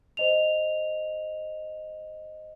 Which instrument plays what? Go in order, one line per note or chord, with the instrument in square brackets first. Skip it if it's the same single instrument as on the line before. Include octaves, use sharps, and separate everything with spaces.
[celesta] C5 D#5 F7